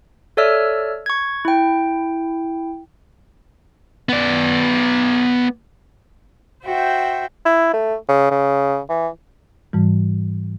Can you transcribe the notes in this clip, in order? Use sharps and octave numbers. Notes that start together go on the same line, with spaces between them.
A4 C#5 D5 E5 E6 F6
C#6 G#6
E4 G5
B3 D5
F#4 C5 E5 G5
E4
A3
C#3
C#3
E3
G#2 E3 G3